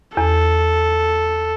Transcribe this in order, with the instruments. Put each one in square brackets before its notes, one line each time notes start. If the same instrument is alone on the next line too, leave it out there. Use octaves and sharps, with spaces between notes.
[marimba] E2 [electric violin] A4